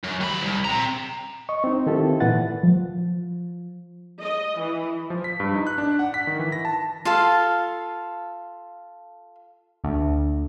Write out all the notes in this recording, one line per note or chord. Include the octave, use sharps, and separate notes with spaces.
F#2
D#2 B5
C2
C4 A#5
D#5 C#6
C4 D#4
D#3 C4 E4 F4 G4 A4
A#2 E3 B4 F#5 A6
F3
D#5
E3
F3
B6
G2
D#4
F#6
D4
F#5
B6
D#3
E3
A#6
A5
F4 A4 F5
D2